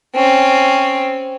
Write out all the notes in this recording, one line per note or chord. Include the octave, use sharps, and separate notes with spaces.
C4 C#4